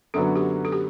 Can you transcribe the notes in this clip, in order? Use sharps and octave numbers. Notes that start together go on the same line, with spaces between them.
F#2 D3 F#3 B3 A4
G4
A4
G4